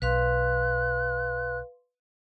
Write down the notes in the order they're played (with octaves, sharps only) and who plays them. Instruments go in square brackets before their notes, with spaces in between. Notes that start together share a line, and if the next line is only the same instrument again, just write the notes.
[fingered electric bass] B1 [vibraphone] B4 F5 C6 [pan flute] F#6